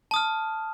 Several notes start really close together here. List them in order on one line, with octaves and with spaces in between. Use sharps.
A5 D#6 F6